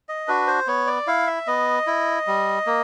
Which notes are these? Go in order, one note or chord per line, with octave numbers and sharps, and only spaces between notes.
D#5
D4 F#4 B4
C5
B3 C#5
D5
E4 F5
E5
B3 D#5
E4
G3
A#3